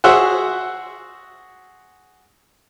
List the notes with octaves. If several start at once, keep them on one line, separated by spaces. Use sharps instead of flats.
F#4 G#4 C5 E5 F#5